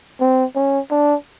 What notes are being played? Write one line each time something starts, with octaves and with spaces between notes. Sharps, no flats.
C4
C#4
D4